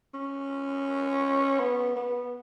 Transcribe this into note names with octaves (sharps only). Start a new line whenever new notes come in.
C#4
B3
B3